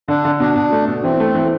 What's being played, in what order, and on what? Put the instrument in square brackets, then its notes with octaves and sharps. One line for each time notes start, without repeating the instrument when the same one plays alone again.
[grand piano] D3 [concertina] D4
[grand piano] D3
[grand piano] B2 [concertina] D4
[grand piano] B2
A3
B2
[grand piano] E3 [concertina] C4
[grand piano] A3
E3